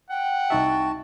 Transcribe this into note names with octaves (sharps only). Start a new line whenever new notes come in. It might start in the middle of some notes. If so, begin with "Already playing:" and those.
F#5 G5
C2 D#4 F#4 E5 A5